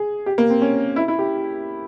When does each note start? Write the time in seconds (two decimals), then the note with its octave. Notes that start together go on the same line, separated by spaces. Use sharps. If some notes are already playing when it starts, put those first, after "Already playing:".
Already playing: G#4
0.26 G4
0.38 A#3
0.50 C4
0.62 C#4
0.96 E4
1.08 E4
1.19 G4